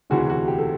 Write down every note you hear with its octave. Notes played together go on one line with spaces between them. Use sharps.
E1 D2 C3 E3 F#4 G#4
F#4
G4
A4